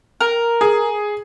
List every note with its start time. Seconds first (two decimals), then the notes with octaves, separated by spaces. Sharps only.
0.21 A#4
0.61 G#4